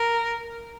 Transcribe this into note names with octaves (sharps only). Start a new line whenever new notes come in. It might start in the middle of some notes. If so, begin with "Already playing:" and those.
Already playing: A#4